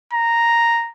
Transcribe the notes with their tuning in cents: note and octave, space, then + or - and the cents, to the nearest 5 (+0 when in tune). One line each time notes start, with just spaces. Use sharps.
A#5 -5